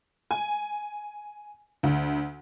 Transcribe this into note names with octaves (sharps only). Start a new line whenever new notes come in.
G#5
D2